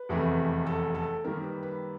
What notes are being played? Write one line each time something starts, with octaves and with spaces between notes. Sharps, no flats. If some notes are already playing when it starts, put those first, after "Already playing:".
Already playing: B4
F1 E2 C3 E3 A3
A4
A4
F#2 D#3 G3 A#3 A#4
B4
B4